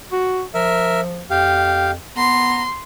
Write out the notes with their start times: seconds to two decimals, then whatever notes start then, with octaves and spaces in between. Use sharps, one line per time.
0.12 F#4
0.54 F3 A#4 E5
1.30 F2 G4 F5
2.17 B3 A#5 C6